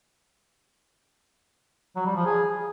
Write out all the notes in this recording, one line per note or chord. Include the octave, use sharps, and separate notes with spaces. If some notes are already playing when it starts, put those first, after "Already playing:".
F#3
G3
F3
G#4